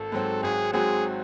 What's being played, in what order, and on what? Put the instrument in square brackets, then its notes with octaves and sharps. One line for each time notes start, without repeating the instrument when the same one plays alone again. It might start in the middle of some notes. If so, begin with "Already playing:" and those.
Already playing: [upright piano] G#1 [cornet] A4
[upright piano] G#2 F#3 C4 F#4
[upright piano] G#1 [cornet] G#4
[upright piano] G#2 F#3 C4 F#4 [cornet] G#4